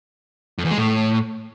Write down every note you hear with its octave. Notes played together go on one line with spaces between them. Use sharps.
F2
E2
G#3
A2